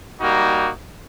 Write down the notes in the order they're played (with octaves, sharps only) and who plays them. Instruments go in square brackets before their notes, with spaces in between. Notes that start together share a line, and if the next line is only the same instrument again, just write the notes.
[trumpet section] G3 A#3 D#4 F#4